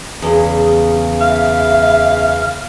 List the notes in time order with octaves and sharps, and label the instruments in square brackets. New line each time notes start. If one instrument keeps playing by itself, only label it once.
[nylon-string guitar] E2 [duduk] C#3 [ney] G#4
[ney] E5 [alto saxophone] F5